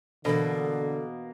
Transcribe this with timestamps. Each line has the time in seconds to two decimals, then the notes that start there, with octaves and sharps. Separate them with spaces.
0.25 B2 D3 E3 A#3 D4 A4